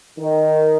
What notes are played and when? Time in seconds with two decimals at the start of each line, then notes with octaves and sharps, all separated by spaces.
0.18 D#3